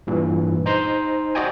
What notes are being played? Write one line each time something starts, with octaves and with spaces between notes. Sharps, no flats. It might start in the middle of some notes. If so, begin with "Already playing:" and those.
G2 A#2 E3
D#4 C5 A#5 C6
F#4 D5 D#5 G5 G#5